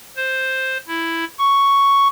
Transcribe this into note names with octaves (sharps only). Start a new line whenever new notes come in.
C5
E4
C#6